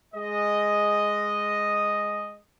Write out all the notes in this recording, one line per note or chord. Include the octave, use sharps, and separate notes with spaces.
G#3 D#5